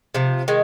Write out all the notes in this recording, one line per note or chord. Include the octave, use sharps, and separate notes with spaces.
C3 F3
D#3 G#3